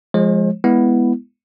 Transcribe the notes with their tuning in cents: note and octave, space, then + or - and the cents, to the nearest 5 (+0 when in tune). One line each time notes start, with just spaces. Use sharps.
F3 +0 G#3 +0 C5 +40
G#3 +0 B3 +0 E4 +0